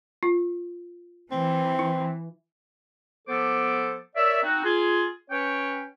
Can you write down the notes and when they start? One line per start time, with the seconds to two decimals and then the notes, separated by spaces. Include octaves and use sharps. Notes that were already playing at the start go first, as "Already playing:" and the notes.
0.23 F4
1.31 E3 C4
1.79 E4
3.28 F3 B3 A4 C5 D6
4.16 A#4 C#5 D5 E5
4.43 C4 D#4 F#4
4.65 F4 G#4
5.31 C#4 B4 C#5 G5